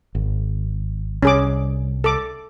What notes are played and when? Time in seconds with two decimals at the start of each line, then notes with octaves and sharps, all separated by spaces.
0.15 G#1
1.23 C2 C#4 G#4 D6
2.04 A4 D6